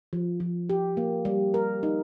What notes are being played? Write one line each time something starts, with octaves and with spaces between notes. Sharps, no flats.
F3
F3
G4
A#3
G3
A#4
D#4